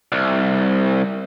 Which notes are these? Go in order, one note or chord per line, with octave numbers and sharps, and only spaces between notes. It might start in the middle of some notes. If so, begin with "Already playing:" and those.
C2